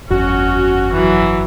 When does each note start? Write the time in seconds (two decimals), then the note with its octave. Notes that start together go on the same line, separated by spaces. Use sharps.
0.10 G1 F2 C#4 F#4
0.93 E3 F#3